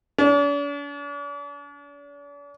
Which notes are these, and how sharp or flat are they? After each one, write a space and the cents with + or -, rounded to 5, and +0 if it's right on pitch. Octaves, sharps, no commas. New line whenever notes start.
D4 -45